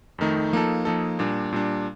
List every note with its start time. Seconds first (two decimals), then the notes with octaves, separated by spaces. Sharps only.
0.18 F2 D#3 A3 D#4
0.52 F3 A#3 D#4 A4
0.85 F3 A#3 D#4 A4
1.19 A#2 G3 D4
1.53 A#2 G3 D4